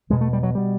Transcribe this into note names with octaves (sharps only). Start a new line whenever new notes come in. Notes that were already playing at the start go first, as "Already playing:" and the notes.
E2 B2 G#3
A3
G3
F#3
B2 G3